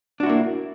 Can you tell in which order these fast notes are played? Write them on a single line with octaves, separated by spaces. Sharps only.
D4 F#4 E4 A#3